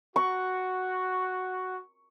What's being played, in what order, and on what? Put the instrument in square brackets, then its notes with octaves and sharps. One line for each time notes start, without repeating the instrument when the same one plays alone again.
[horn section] F#4 [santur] C#6